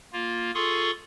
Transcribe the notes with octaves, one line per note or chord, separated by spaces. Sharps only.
A#3 F4
F4 G#4 A4 C6 C#6 D#6